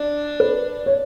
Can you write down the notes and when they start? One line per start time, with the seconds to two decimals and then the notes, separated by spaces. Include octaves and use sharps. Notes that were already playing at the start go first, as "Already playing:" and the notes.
Already playing: D4
0.40 B4
0.86 C#5